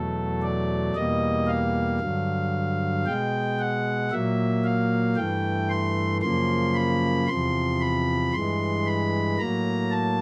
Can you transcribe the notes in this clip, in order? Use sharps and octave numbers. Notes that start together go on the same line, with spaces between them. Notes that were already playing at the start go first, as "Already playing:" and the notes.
Already playing: E2 B2 F#3 A3 A4
D5
E2 B2 G3 A#3 D#5
F5
G2 D3 F#3
B2 G#3 G5
F#5
A#2 F#3 A#3 E5
F5
G2 E3 A3 G5
C6
F#2 C#3 F3 A#3 C6
B5
E2 C3 F3 C6
B5
G2 E3 G#3 C6
B5
A2 F#3 A#3 A#5
A5